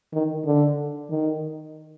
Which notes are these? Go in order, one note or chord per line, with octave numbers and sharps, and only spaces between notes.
D#3
D3
D#3